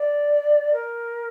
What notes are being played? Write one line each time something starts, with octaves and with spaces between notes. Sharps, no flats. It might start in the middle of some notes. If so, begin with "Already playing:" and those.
Already playing: D5
A#4